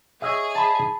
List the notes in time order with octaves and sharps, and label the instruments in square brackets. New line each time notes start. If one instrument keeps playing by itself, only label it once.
[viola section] G#4 [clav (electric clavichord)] C#5 D#5 E5
[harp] A5 B5